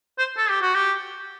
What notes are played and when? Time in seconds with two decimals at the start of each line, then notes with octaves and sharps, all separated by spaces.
0.18 C5
0.37 A4
0.50 G4
0.62 F#4
0.75 G4